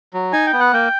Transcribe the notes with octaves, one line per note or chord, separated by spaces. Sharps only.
F#3
D#4 G#5
G5
B3
F#5
A#3 G5